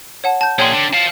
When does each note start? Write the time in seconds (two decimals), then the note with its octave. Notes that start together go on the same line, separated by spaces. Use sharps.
0.24 C#5 F#5 A5
0.41 A5 G6
0.58 A#2 G#4 C#5 G5 C6
0.73 D3
0.94 F5 A5